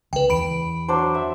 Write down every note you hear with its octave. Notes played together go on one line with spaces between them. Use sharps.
C#2 B4 G5
E2 B5 D7
F#3 D4 C5
E5